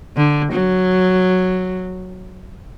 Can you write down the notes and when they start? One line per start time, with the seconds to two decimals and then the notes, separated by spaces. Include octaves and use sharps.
0.17 D3
0.52 F#3